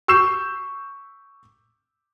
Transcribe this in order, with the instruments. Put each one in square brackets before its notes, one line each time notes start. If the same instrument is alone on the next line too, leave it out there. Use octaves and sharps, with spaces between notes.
[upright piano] C#6 E6 G6 C7 E7